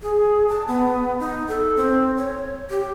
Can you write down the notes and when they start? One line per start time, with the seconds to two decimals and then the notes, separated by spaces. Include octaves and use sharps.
0.02 G#4
0.48 A5
0.68 B3
1.20 D#4
1.48 A4
1.77 C4
2.17 C#5
2.70 G4